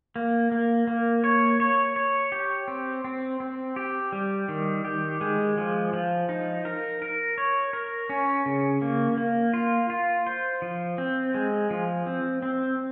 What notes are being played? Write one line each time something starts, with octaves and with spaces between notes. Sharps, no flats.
A#3
A#3
A#3
C#5
C#5
C#5
G4
C4
C4
C4
G4
G3
D#3
G4
G#3
F3
F3
D#4
A#4
A#4
C#5
A#4
C#4
C#3
A#3
A#3
F4
F4
C5
F3
C4
G#3
F3
C4
C4